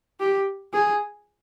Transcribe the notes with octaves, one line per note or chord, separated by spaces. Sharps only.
G4
G#4